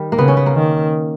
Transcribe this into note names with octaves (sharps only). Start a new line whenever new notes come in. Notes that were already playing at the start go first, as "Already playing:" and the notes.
Already playing: D#3 G3
A#3
C#3 B3
C#4
B3
A#3
D#3